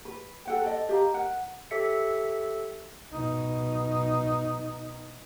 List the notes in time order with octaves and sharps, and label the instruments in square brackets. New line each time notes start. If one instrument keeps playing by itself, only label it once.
[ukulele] B4
A4 F#5 G5
A4 D5 D#5
G4 D#5 F5 A#5
A#4 F#5
[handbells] G4 A4 C#5 E5 B6 C#7
[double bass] B2 D#4